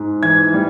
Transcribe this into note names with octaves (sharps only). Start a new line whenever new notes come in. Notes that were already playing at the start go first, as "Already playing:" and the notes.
Already playing: G#2
E3 G#6
G3